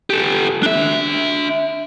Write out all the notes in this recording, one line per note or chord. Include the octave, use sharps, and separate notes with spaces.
G4 A4
D4 E5